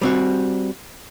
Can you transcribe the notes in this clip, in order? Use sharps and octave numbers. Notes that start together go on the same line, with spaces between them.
G3 C4 F#4